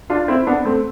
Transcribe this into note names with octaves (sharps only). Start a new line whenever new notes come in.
D4 F4
C4 E4
B3 D4
A3 C4